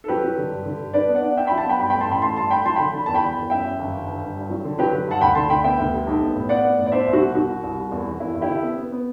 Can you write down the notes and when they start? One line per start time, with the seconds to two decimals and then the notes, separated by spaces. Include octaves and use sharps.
0.04 A4
0.08 F#3 G4 B4
0.23 F#3
0.38 D3
0.51 G2
0.65 D3
0.80 G2
0.94 D4 B4 D5
1.08 B3
1.15 D5 F#5
1.22 D4
1.36 D4 E5 G5
1.47 F#3 G5 B5
1.58 F#5 A5
1.66 B3 G5 B5
1.79 G2 G5 B5
1.90 A3 G5 B5
2.00 A5 C6
2.09 A1 G5 B5
2.22 A3 A5 C6
2.36 G2 A5 C6
2.50 A3 G5 B5
2.65 F#3 A5 C6
2.76 D3 G5 B5
2.93 D3 B5
3.06 E2 A5
3.15 G5 B5
3.23 E1
3.36 E2
3.50 F#2 E5 G5
3.64 F#2
3.79 G1
3.93 G1
4.07 G1
4.21 G1
4.36 G2
4.50 F#3
4.64 D3
4.79 F#3 G4 B4
4.92 D3
5.07 G2 F#5 A5
5.21 D2 G5 B5
5.35 D3 A5 C6
5.50 D2 G5 B5
5.64 B3 E5 G5
5.79 D2
5.93 G3
6.07 B1
6.22 B3
6.35 A2
6.49 B3 D5 F#5
6.64 B3
6.78 A2
6.87 D5
6.92 B2 C5 E5
7.06 C2
7.13 F#4
7.20 B2
7.35 C2 F#4
7.49 G3
7.63 C2
7.78 G3
7.92 E2
8.06 E1
8.20 E2 E4
8.35 E2
8.42 E4 G4
8.49 D3
8.63 B3
8.77 B3
8.92 B3